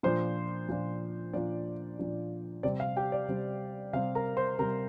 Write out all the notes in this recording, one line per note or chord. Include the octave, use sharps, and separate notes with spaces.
A#2 F3 D4 C5 C6
A#2 F3 D4
A#2 F3 D4 D5
A#2 F3 D4
C3 G3 C4 D5
F5
G4 G5
D5
C3 G3 C4
C3 G3 C4 F5
A#4 A#5
C5 C6
C3 G3 C4 A#4 A#5